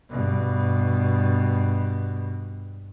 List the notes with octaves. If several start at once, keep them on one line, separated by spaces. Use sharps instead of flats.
G2 B2